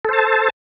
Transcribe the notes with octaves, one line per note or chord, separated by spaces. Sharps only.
A4 C5 A5